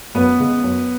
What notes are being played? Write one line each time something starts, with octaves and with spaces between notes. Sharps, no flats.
F#2 B3 B4
C#3 G#3
F#2